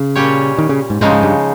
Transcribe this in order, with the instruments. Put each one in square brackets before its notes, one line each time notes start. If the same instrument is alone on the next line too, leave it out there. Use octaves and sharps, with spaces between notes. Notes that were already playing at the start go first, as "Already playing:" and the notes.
Already playing: [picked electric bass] C#3
[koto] A#2 G3 C#4 G4 C#5
[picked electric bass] D#3
C#3
G#2
[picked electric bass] G#2 [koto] C#3 F3 G#3 D#4
[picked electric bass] G#2
G2